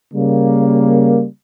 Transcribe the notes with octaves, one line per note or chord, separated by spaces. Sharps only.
C#3 G3 A#3